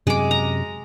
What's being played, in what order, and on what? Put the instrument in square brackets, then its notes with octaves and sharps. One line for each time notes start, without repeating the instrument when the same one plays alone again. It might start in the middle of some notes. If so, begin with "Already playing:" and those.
[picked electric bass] F#2 C3 [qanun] G#3 D6
[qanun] A#5